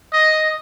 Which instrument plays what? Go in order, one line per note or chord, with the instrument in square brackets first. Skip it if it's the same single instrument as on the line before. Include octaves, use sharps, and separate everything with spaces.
[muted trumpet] D#5